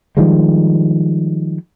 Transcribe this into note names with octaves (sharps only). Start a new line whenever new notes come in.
D#3 F3 G3 G#3